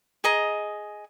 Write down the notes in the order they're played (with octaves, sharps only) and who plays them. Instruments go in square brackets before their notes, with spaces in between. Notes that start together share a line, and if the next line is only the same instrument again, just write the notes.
[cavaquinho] G#4 D#5 A#5